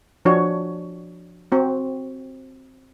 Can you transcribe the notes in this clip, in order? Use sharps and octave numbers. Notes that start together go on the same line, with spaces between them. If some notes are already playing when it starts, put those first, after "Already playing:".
F3 D4 F#4 C#5
C4 F#4